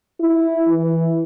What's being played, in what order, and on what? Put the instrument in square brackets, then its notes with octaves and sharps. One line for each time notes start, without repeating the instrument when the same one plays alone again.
[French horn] E4
E3